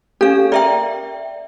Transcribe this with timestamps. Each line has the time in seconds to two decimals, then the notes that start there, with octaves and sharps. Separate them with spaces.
0.21 C#4 G4 A4 F5
0.52 A#4 D5 E5 G5